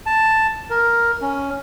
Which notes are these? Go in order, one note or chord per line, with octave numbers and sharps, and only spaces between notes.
A5
A#4
C#4